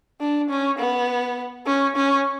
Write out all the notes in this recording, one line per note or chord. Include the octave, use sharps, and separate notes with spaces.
D4
C#4
B3
C#4
C#4